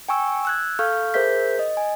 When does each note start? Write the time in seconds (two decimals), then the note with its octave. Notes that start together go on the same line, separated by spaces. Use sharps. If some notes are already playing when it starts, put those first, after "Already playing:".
0.09 G5 G#5 C#6 E6
0.45 E6 F#6 G#6
0.79 A4 F5 C#6 F6 G6
1.14 G#4 A#4 C5 E5 G6 B6
1.59 D#5
1.77 G#5